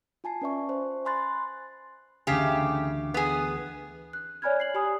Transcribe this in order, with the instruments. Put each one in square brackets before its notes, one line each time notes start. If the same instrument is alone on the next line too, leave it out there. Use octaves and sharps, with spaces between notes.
[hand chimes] F4 G#5 A5 C7
C#4 B4 D5 E5 C#6
C5
G#5 B5 C6 F#6 A6
[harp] D2 E3 A3 [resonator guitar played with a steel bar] C#3 G4
[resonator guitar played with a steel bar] B3 G#4
[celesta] F#6
C#5 D5 G#5 B5 F6 G#6
C7 F#7
G4 G#5 B5 D#6